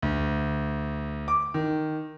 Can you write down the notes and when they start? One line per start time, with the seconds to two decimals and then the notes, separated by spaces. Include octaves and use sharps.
0.02 D2
1.28 D6
1.54 D#3